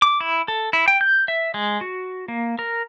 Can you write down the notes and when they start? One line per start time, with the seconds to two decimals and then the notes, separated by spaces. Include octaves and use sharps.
0.02 D6
0.21 E4
0.48 A4
0.73 E4
0.88 G5
1.01 G6
1.28 E5
1.54 G#3
1.81 F#4
2.28 A#3
2.59 A#4